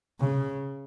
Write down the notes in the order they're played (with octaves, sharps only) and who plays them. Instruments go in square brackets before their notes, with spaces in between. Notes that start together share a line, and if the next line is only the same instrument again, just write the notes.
[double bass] C#3